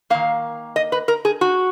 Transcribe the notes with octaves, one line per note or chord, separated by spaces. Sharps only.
D#3 A#3 F5
D#5
B4
A#4
G#4
F#4